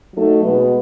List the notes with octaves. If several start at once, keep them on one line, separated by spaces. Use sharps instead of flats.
F#3 A3 D#4 A4
B2 G#3 B3